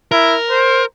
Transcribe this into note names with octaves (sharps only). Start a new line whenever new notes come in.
E4 A#4
C5